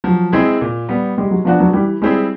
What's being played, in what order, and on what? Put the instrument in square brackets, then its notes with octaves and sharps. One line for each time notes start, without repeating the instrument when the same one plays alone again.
[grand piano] F3 [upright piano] F#3
[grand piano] G#3 C4 E4 G#4
A#2
G3 B3
[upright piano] G3 [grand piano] G#3
[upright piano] F#3
[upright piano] F3 [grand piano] B3 D4 F#4
[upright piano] F#3
[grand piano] E3 [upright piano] G3
[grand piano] G3 C4 E4 G#4 [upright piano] G#3